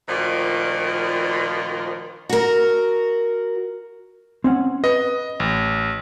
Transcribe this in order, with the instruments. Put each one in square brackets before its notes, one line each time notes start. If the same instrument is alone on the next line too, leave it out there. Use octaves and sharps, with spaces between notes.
[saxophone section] D2 A#2 D#3 F3
[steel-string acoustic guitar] F#4 A#4
[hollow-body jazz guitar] C4 C#4 F#5
[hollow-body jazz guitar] B4 [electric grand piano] D#5
[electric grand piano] A1